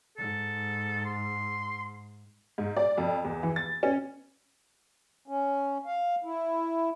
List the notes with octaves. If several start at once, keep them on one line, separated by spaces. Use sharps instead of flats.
G#2 A4
C6
G#2
D5
F2
E2
E3
A6
C#4
C#4
F5
E4